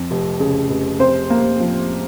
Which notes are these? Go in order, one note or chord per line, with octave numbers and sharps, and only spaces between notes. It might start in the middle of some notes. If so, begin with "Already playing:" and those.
Already playing: F2
F1
C#3
F1
C3 C5
A#3
F3